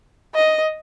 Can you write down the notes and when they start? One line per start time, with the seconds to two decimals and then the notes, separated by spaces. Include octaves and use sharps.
0.35 D#5